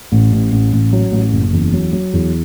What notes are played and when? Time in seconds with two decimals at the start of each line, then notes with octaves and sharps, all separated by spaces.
0.12 A1
0.32 A1
0.52 A1
0.73 A1
0.93 F#3
1.12 A1
1.33 F#1
1.53 E2
1.73 F#3
1.93 F#3
2.13 E2